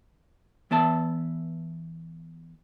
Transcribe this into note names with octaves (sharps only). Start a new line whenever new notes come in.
E3 B3 E5 A5